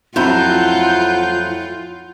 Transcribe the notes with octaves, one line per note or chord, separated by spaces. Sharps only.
F2 F#3 E4 F4 F#5 G6